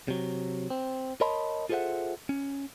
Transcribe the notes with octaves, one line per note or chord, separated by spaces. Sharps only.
C3 F#3
C4
A#4 C#5 D#5 A5 B5 C6
F4 G#4 A4 C5 E5 F#5
C#4